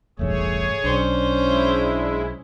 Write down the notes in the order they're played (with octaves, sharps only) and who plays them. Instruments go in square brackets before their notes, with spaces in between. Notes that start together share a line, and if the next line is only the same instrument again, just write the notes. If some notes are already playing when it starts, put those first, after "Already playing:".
[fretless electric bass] E1 A1 G2 [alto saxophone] A3 [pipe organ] G#4 C#5
[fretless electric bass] B1 [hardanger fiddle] C#4 C5 [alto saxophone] D4
[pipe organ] G#3 E4